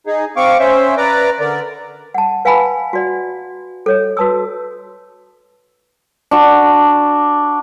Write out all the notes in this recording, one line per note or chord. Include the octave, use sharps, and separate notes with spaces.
D#4 G#4
C4 F5 C#6 D6
C#4 C5 E5
B4 D5 A#5 D6
D3 A#4 D5
F#5 A5
B4 F5 F#5 G#5 A5 B5
F#4 D5 F#5
A4 C#5 D#5
F#4 B4 A5 D#6 E6
D4 F#4